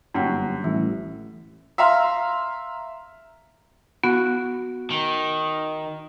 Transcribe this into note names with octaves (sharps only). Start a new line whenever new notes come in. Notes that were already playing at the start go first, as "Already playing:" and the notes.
G1 F#2 A#3 D#4 G5
A1 E3 G3
E5 F5 A#5 C6 F6
B3 F#4
D#3